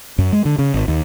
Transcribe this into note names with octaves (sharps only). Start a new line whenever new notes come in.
F#2
G#3
D3
C#3
G#1
D#2